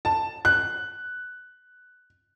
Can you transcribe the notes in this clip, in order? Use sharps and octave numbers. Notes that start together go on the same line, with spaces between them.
A5
F#6